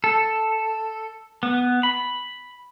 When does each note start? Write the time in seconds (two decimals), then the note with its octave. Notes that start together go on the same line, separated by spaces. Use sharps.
0.04 A4
1.43 B3
1.83 B5